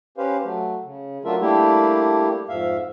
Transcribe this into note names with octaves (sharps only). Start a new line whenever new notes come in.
C#4 G4 B4 C5 F5
F#3 A3
C#3
F#3 A3 D4 F4 A#4 E5
G3 A3 A#3 D4 E4 G4
F2 G#2 E5 F5